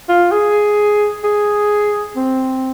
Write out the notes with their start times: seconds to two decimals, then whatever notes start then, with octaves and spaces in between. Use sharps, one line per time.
0.09 F4
0.31 G#4
1.24 G#4
2.16 C4